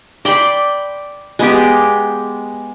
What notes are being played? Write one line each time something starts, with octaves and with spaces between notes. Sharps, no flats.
D5 G5 B5 C6
G#3 B3 G4